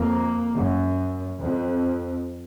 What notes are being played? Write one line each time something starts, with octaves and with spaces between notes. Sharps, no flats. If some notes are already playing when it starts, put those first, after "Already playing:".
Already playing: F2 A#3
F#2
F2